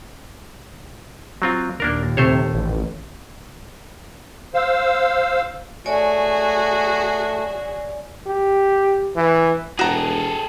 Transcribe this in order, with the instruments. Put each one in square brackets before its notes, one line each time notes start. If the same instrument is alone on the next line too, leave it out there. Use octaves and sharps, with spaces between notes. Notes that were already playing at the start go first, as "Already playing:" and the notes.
[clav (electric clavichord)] F#3 C4 F4
[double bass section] D#2 A#2 [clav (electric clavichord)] A#3 D4 A#4
[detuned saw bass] C3 [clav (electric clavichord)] A3 C5 C#5
[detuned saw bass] A1
[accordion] C5 F5 E6
[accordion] A3 [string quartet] F#4 G#4 [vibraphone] C#5 D5 G#5
[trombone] G4
E3
[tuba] E1 [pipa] F#4 A#5 [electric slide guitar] G#4 A4 G5